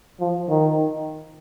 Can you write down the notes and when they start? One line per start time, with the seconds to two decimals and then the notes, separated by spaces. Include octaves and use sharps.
0.20 F3
0.49 D#3